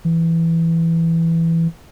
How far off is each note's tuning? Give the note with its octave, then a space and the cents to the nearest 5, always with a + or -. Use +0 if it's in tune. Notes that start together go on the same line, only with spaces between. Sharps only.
E3 +5